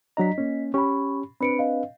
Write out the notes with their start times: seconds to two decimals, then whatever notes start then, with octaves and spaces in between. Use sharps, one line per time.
0.17 F#3 D4 D#5 A#5 B6
0.38 A#3 C#4
0.74 C#4 G4 B5 C#6
1.41 C4 D4 B4 B5 C#7 D7
1.59 D#5 F5